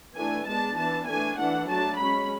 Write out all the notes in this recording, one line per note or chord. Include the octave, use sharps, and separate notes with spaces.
E3 A3 D4 G#5
G#3 B3 D4 A5
E3 B3 D4 A5
E3 A3 D4 G#5
E3 A3 D4 F#5
F#3 A3 D4 A5
G#3 C#4 B5